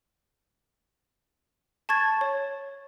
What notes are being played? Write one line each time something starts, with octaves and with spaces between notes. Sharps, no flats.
A5 C#6 G#6 A6
C#5